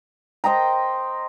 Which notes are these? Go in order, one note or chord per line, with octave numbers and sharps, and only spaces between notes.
C5 D#5 G5 A#5